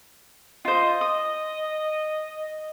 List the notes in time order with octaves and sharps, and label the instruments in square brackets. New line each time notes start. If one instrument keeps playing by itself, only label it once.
[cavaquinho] F4 C5 [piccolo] D#5
[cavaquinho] D#6